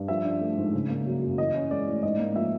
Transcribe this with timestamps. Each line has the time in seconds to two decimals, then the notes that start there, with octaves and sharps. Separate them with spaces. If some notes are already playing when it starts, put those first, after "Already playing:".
Already playing: G2
0.08 F3 E5
0.25 D4
0.41 A3
0.57 G#2
0.73 C#3
0.90 A#3
1.06 F#3
1.22 F#2
1.38 E3 D#5
1.54 C#4
1.70 G#3 D5
1.87 A2
2.03 G#2 D#5
2.19 A#3
2.36 F3 E5